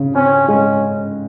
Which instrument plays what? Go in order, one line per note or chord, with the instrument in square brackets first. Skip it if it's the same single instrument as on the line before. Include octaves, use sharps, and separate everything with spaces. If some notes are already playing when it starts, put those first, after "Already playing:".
Already playing: [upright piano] C#3
[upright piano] C4 [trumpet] C#4
[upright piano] G#3 [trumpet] C#4